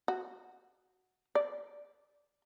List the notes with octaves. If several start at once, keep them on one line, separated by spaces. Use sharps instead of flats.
F#4
D5